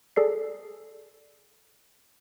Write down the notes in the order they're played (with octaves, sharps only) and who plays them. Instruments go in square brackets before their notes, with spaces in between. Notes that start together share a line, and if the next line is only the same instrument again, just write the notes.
[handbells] G#4 A4 D5 C7